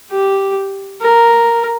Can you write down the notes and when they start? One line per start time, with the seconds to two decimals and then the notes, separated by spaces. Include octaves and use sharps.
0.11 G4
1.01 A#4